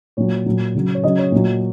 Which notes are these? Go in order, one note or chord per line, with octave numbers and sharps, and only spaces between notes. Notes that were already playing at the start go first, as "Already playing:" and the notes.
A#2 F#3 C#5
A#2 F#3
C#3 F#3
C#5
C#3 F#3 D#5
C#5
A#2 F#3